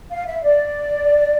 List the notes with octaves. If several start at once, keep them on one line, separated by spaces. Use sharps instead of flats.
F5
E5
D5